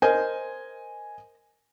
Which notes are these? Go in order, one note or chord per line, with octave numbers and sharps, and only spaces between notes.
A#4 C5 D#5 G#5